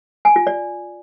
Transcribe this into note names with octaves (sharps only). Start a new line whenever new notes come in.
G#5
F4
D5